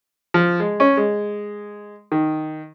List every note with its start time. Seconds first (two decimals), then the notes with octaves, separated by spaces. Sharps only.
0.34 F3
0.60 G#3
0.80 C#4
0.97 G#3
2.12 D#3